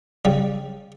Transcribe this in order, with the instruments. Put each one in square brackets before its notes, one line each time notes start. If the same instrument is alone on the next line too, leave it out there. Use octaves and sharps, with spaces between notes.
[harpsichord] C#3 G3